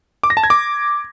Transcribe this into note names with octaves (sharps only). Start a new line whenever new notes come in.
D6
A#6
A5
G#6
D6